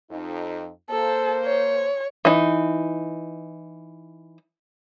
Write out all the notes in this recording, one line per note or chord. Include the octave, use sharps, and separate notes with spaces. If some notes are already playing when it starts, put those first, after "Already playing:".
F2 D#4
A#3 A4 C5
C#5
E3 D#4